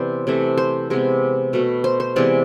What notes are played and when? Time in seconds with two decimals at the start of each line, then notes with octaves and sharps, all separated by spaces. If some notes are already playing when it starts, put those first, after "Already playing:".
Already playing: C3 E3 B3 C5 D5
0.27 C3 E3 A3
0.58 C5
0.90 C3 G#3 B3
1.53 B2 A3
1.84 C5
2.00 C5
2.16 C3 E3 G#3 B3 D5